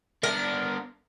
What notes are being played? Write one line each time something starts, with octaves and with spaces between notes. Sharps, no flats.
B3 D4 A#4